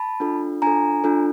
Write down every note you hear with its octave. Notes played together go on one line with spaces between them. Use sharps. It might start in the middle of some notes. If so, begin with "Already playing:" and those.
Already playing: A5 B5
D4 F4 A4
D4 F4 A4 G#5 A#5
D4 F4 A4